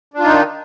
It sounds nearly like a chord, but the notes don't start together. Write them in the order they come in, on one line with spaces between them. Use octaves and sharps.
D4 F4 D#4 D#3